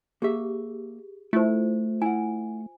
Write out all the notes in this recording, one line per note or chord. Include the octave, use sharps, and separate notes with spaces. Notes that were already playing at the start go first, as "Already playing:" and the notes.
A#3 G4 G#4 E5
A3 E4 F4 C5
E4 F#5 G#5